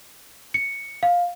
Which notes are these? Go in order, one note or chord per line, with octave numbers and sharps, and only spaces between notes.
C#7
F5